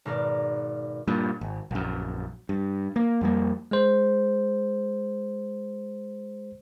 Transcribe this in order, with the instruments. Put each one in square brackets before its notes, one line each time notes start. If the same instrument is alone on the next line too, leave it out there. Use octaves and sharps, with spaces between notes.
[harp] G#1 B2 A#4 D5
[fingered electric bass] G2 A#2
G#1
A#1 F#2
G2
A#3
F2 G3 A#3
[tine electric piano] G#3 G#4 C5